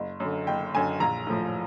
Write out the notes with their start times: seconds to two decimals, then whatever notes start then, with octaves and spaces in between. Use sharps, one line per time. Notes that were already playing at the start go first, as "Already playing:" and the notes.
Already playing: F#1
0.20 F#2 D3
0.47 F#1 G5
0.74 F#2 D3 G#5
1.00 A#1 A#5
1.27 A2 F3